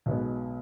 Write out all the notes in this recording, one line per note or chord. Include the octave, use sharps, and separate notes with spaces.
B1 B2 G#3 B3